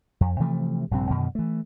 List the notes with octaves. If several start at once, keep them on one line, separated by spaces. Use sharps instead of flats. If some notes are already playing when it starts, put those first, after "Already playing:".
F2
C3 E3 F3 A3
A#1 G2 C3 C4
F#2 B2 D3 D#3
E3 A3